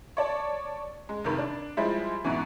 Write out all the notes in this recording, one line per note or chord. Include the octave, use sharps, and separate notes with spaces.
C#5 D5 A5
G#3
F1 C3 D#3 B5
D4
F3 G3 G#3 E4
G#2 B2 E3